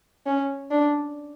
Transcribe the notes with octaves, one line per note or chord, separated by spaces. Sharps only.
C#4
D4